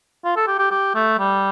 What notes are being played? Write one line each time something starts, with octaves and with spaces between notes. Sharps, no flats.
F4
A4
G4
G4
G4
A3
G3